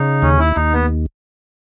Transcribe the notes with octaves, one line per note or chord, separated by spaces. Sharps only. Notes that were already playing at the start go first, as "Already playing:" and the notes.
Already playing: C#3 D#4
D#2 C#4
E4
D#2 D#4
B3